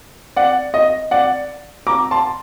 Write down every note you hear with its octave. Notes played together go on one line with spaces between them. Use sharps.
D5 F#5
D#5
D5 F#5
A#5 D6
A5 C6